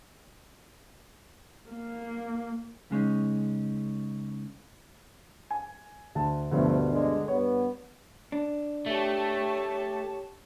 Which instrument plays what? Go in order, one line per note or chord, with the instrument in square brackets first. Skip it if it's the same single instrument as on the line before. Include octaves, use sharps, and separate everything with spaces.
[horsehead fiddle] A#3
[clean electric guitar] C#3 G#3 C#4 D#4
[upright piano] G#5
D2 A5
[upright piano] D2 G2 B2 [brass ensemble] F3 A3
[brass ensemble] D3 G#3
[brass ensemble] G2 B3 [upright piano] C#5
[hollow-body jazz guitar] D4
[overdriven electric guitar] A3 [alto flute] G4 [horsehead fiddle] C#5 A5